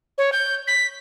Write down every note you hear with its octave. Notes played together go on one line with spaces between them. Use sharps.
C#5
G6
B6